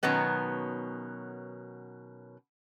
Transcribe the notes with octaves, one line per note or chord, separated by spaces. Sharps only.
B2 D#3 F#3 B3 C#4